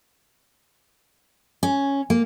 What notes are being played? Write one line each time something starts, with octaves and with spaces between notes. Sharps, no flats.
C#4
A#3